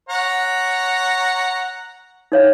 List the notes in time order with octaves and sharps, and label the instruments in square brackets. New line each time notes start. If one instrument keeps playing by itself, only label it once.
[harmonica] C#5 F#5 A#5
[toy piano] D#4 C#5 F5